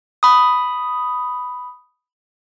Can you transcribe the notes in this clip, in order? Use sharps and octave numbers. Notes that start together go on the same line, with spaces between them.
B5 D#6